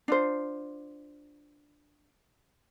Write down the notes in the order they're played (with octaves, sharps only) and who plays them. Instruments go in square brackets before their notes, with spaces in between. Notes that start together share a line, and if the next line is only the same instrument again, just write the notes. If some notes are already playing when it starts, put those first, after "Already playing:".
[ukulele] D4 F4 C5